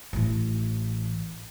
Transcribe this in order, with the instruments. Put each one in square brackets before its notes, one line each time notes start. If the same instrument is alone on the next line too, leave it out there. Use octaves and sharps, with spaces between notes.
[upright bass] A1 E3